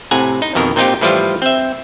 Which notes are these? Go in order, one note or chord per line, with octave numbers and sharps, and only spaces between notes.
A2 C3 F#5 G#5 A#5
D#4
F2 B2 D#3 A#4
A#2 C4 D#4 F4 G4
A2 E3 F3 G3 F4
C4 E5